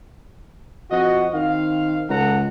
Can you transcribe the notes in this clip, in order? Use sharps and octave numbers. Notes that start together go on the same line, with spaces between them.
F2 F#4 D#5
D#3 C4 F5
C#2 A4 F#5 A#5